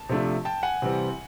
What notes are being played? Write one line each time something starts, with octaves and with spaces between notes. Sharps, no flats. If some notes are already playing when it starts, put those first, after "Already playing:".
Already playing: A5
C3 F3 A3 D4
G5 A5
F#5 G#5
C3 E3 G3 C4